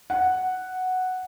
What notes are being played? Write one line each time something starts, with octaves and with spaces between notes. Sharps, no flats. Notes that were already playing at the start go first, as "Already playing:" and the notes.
F#5